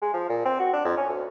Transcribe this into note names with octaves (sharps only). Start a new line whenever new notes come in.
G#3
F3
A#2
C4
F#4
D4
F2
C#4
D2